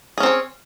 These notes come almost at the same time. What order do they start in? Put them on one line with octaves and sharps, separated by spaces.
G#4 C#4 C4 C#5